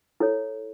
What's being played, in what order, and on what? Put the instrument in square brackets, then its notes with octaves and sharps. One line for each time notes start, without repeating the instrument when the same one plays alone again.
[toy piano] E4 A4 C#5